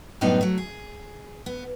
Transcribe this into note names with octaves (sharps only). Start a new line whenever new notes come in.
F#2 A2 G3 B3 D4 D#4
F#3 A3
G#4
B3